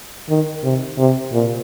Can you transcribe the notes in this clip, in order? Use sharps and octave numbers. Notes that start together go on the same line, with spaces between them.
D#3
C3
C3
A#2